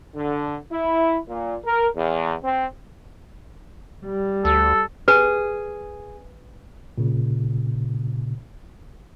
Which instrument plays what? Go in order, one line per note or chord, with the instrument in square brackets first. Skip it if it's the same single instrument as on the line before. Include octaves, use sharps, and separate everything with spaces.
[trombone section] D3
E4
A#2
A#4
E2
C4
[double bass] G3
[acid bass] D2 [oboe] A4
[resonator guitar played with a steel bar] G#4 [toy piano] B4
[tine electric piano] A#2 C#3